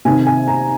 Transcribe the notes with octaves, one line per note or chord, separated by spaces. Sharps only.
C3 D#3 G#5
G#5
A#5